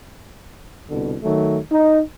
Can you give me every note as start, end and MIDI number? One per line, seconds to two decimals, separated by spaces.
0.89 1.16 36
0.89 1.16 47
0.89 1.16 50
1.22 1.57 51
1.22 1.57 54
1.22 1.57 57
1.71 1.99 63